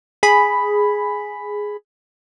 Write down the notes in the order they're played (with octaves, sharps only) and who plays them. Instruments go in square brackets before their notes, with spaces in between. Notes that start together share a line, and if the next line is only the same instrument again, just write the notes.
[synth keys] G#4 B5